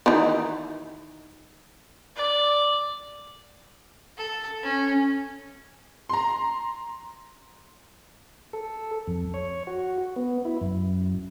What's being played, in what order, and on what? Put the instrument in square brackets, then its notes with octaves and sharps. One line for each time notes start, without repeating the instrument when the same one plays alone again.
[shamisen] D#3 E3 D#4
[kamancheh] D5
[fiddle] A4
C#4
[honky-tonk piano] A#5 C6
[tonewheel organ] A4
F2
C#5
F#4
B3
E4
F#2